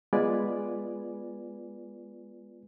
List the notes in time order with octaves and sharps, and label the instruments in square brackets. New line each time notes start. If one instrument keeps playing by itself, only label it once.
[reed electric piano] G#3 B3 F4 B4 D5 G#5